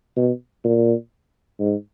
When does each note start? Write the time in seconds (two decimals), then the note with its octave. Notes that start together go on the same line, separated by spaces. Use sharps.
0.16 B2
0.65 A#2
1.60 G#2